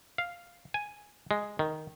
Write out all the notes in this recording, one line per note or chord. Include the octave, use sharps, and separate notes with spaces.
F5
G#5
G#3
D#3